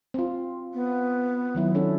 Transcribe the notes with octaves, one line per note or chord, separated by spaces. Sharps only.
C4 F4
B3
D#3 F#3 E4
C#4 D4 A4